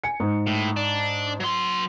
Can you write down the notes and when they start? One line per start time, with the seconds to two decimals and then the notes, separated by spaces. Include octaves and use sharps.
0.04 G#5 C#7
0.20 G#2
0.47 A2
0.77 D4
1.40 F#3 C6